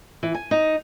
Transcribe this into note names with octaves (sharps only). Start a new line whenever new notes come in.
E3
G#5
D#4